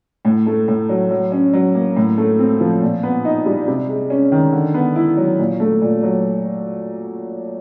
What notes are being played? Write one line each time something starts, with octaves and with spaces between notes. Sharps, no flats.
A2
A3
A2
F#3
F#3
C#4
F#3
A#3
A2
A3
C4
F3
A#2
B3
D#4
G3
C3
G#3
C#4
D#3
D3
B3
E4
F#3
A#2
A3
A#2
F#3